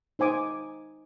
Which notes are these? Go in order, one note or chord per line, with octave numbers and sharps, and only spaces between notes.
D#4 C5 G#5 D6 D#6